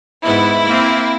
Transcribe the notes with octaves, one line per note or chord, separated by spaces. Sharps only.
G#2 B3 E4
A#3 C4